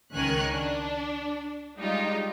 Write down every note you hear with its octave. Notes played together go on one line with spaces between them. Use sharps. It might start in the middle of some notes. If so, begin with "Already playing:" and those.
C#2 D#3 C#4 A#4 G#5 F#6
D4
G3 G#3 D#4 F4 G4